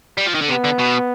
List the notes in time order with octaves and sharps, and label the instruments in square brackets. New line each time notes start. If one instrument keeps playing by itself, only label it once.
[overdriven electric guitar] G3
F3
D#3
D3
[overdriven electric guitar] C3 [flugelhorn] B3
[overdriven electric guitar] D3
B2